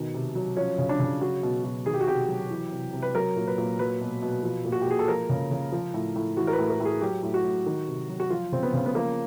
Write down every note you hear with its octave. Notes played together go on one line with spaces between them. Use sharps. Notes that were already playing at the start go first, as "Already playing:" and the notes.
Already playing: B2 D#3
C3
F#3
F3 C#4
C#3
D4
C#3
F#3 F#4
B2
B2
D#3 G#4
G4
F#4
C3 G4
F#3
E3
C3
C3
B4
F#3 A#4
A#2
B4
A#2
F#3 B4
B2
B2
F3
A#2
F#4
G4
A#2 G#4
A4
F3 A#4
C#3
C#3
F3
A2
A2
E3 F#4
A#4
B4
A2
A#4
A2
G#4
F#3 G4
A2
F#4
A2
D#3
C3
F#3
F#4
F3 F4
C#3 C4
B3
C#3
B3
F3 A#3